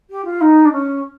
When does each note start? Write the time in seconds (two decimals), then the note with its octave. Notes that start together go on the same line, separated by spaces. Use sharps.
0.10 G4
0.24 F4
0.40 D#4
0.64 D4
0.72 C#4